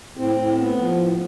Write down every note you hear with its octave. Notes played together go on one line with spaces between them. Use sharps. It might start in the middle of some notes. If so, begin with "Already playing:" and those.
A2 C4
A2
B3
F3
A2